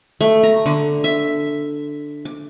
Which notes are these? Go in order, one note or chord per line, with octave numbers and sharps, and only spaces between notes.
A3
A#5
D3
E5
D6